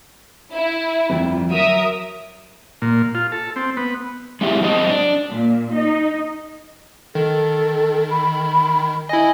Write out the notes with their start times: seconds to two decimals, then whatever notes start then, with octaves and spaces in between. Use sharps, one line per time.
0.54 E4
1.10 G1 F2
1.50 F#3 A#4 E5 D#6
2.82 A#2
3.15 F4
3.32 A4
3.56 C4
3.77 B3
4.41 G#3 C4 E4 F4 G4 G#4
4.61 F#2 G#3 C4 F4 D#5 A5
4.89 D4
5.30 A#2
5.74 D#4
7.15 D#3 A4
8.10 B5
9.09 E4 D#5 G#5